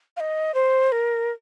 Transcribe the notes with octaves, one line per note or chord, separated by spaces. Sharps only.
F5
D#5
C5
A#4